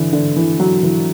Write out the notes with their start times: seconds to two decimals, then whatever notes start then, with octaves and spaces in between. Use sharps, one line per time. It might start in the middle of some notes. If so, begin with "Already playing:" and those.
Already playing: D3 E3
0.13 D3
0.36 E3
0.60 F#3
0.83 E3